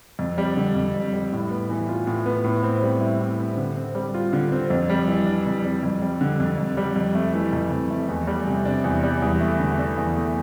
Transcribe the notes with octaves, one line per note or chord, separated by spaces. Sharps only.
F2
G3
D3
F2
F2
G3
A2
B3
E3
F4
A2
B3
A2
C4
G3
E4
A2
C4
D3
C4
G3
F4
D3
C4
F2
G3
E3
D4
F2
G3
F2
G3
D3
F2
F2
G3
F2
A3
E3
F2
F2
A3
E2
G3
C3
D4
E2
G3
E2
A3
D3
D4
E2
A3